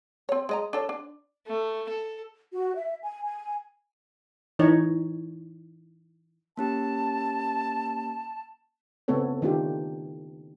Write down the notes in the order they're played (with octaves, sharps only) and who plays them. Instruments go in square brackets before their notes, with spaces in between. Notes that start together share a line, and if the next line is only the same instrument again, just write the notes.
[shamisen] C4 C#5
G#3 D#5 A#5
D4 A4 C#5
D4
[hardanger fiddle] A3
A4
[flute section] F#4
E5
G#5
G#5
[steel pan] E3 D#4 C#5
[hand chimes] A#3 C#4 G4 [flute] A5
[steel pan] C#3 A3 B3 C4 A4 C#5
D#3 A3 D4 D#4 F4 G4